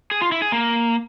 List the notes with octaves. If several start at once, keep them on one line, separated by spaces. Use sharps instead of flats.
G#4
F4
E4
G#4
A#3